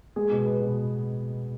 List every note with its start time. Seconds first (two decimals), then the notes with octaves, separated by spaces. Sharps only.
0.16 G#3 G#4
0.31 B2
0.45 B3
0.61 B2